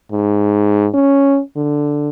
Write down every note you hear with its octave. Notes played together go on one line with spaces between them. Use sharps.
G#2
C#4
D3